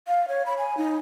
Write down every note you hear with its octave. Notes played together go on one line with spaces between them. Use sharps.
F5
C#5
B5
G#5
D#4